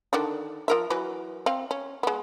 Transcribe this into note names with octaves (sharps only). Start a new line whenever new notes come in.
D3 D#3 D4
F3 A#4 E5
E3 F#3 B4
C4 F5
C#4
G#3 B3